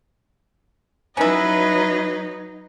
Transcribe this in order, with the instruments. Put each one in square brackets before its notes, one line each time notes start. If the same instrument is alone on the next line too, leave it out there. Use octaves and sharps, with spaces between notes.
[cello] F#3 D#4 [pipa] C#4 E4 [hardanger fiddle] B4 D#5